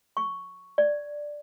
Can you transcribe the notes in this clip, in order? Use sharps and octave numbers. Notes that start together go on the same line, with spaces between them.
C#6
D5